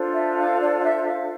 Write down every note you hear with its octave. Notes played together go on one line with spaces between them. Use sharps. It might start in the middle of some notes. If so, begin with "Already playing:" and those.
Already playing: D4 F4 A4 C5
E5
F5
D5
F5
E5
F5